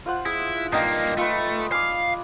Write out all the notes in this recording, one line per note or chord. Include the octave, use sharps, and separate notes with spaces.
F4 C5 F#5
E4 G#4
G2 A#3 D#4 G5
A3 F4 B4
D5 F5 G#5